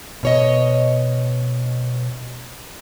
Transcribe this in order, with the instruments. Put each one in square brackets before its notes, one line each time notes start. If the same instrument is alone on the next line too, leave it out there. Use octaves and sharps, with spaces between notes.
[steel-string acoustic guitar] B2 C#5 D#5